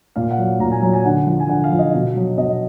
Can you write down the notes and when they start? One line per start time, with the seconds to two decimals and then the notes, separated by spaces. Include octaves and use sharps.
0.16 A#2 F5
0.31 F#5
0.38 F#3
0.60 A#2 A#5
0.71 G#5
0.82 F#3 A#5
0.94 G#5
1.05 D3 F#5
1.27 F3
1.40 G#5
1.49 D3 F#5
1.64 F5
1.72 F3
1.79 D#5
1.94 B2
2.16 F#3
2.38 B2 D#5